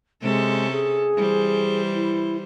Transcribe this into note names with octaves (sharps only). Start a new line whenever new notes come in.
C3 G#3 C#4 A4
G#4
E3 G3 C5
E4